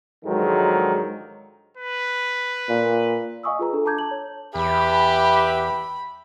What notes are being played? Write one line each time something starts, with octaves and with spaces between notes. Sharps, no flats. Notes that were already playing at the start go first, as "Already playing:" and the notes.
G#2 D3 D#3 F3 F#3 G#3
B4
A#2
D#5 F5 G#5 C#6 D#6 E6
F4 G#4 B4 A#5
D4 A4
A5 A#5 D6 G6 G#6
A5 F#7
C#5
E2 G4 B4 E5 B5